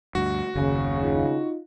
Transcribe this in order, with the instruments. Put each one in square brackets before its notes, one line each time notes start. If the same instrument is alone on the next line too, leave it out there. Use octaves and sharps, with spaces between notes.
[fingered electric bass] D2 G2 [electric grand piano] F#4
[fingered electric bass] F#1 D#2 [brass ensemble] C#3
[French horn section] D#4 F4